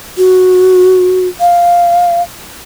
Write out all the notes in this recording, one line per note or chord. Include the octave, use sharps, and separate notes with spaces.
F#4
F5